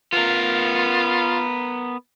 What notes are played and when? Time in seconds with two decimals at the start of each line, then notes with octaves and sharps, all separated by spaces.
0.13 B3 F4 A#4